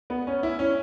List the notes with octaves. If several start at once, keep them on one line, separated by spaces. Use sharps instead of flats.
B3
C#4
E4
C#4